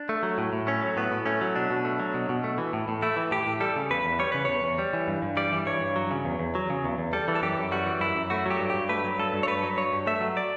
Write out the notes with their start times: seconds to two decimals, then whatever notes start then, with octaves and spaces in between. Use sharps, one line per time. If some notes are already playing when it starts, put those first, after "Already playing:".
Already playing: D4
0.09 A3
0.23 F#3
0.38 A2
0.53 A2
0.67 A3 C#4
0.82 F#3
0.97 A2 B3
1.11 A2
1.26 A3 C#4
1.41 F#3
1.56 B2 D4
1.71 B2
1.85 A3
2.00 F#3
2.14 B2
2.29 B2
2.44 A3
2.58 E3
2.73 A2
2.88 A2
3.02 A3 E4
3.16 E3
3.31 A2 G4
3.47 A2
3.60 G3 A4
3.76 C#3
3.90 E2 B4
4.05 E2
4.19 G3 C#5
4.32 C#3 B4
4.45 E2 C#5
4.64 E2
4.78 G3
4.93 E3
5.08 G2
5.22 G2
5.37 G3 D5
5.52 E3
5.66 G2 C#5
5.81 G2
5.96 F#3
6.11 C#3
6.25 E2
6.39 E2
6.55 F#3
6.70 C#3
6.85 E2
6.98 E2
7.13 G3 A4
7.28 E3
7.35 A4
7.42 F#2 G4
7.57 F#2
7.71 G3 F#4
7.86 E3
8.01 F#2 E4
8.15 F#2
8.30 A3 F#4
8.46 F#3 G4
8.59 G2
8.70 G2 G4
8.89 A3 B4
9.04 F#3
9.19 G2 A4
9.34 G2
9.43 C#5
9.47 A3 B4
9.63 F#3
9.77 G2 C#5
9.93 G2
10.07 A3 E5
10.21 F#3
10.37 D5